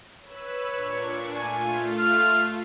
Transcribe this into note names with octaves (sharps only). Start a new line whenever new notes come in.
B4 C#5 B5 E6
A#2 D4 C#6
A3 F4 G#5
F6